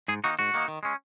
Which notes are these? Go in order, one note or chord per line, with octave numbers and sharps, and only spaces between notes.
G#2 G#4
D#3 A#3 D#4 F#4
G#2 F#4
D#3 A#3 D#4
D#3
G#3 C#4